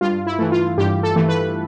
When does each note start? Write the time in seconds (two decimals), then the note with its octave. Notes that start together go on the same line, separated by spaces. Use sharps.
0.01 G2 F4
0.27 E4
0.39 E3 A3
0.52 F4
0.78 G2 G4
1.03 A4
1.16 E3 A3
1.28 B4